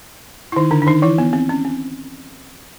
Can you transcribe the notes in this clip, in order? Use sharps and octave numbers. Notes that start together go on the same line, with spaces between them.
E4
D#3 D#4
D3 D4
D4
D#3 D#4
E3 E4
B3
C4
C#4
C4